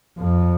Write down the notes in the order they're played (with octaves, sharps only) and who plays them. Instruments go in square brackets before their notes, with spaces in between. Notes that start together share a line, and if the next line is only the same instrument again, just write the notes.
[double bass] F2